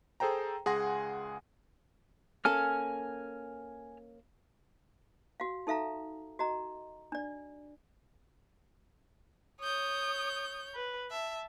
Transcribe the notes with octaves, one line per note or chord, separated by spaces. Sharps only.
G#4 A4 C5 G5 A#5
C#2 G#4 F#5 G#5 C6 A#6
A#3 C#4 A4 G#5 F6
F#4 F5
D#4 A4 E5 F5 A#5
F#4 D#5 A#5
D4 D5
C#5 D#6 G6
B4
E5 A5